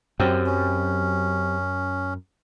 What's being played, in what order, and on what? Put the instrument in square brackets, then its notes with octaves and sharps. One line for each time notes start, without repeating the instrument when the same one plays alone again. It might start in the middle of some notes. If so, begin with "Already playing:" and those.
[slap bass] F#2 [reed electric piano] F#3 C4 G4
[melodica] C#4